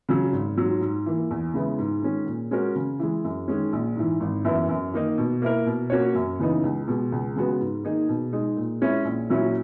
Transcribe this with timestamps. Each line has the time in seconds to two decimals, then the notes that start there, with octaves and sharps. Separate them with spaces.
0.09 C#3 F#3
0.33 G#1
0.58 G#2 F#3
0.81 G#2
1.06 E3 A#3
1.31 E2
1.54 C#3 G#3 B3 E4
1.79 G#2
2.02 D#3 G#3 C#4
2.26 A#2
2.51 G#3 C#4 F#4 A#4
2.76 C#3
2.99 E3 G#3
3.24 F#2
3.48 D#3 G#3 C#4
3.73 A#1
3.96 G#2 E3
4.20 G#1
4.44 F#2 E3 B3 E4
4.69 F#2
4.94 D#3 A#3 D#4
5.18 B2
5.42 A#3 E4 A#4
5.66 B2
5.90 A#3 C#4 F#4 C#5
6.15 F#2
6.39 C#3 E3 B3 D#4
6.63 C#2
6.88 B2 G#3
7.12 C#2
7.36 C#3 G#3 B3 F#4
7.60 G#2
7.84 D#3 A#3 D#4 G#4
8.09 B2
8.33 G#3 D#4
8.57 A#2
8.81 G#3 C#4 E4
9.05 A#1
9.30 A#2 F#3 C#4 E4